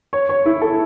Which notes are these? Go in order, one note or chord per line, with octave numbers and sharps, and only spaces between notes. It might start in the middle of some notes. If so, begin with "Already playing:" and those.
C#5
C#5
E4
A4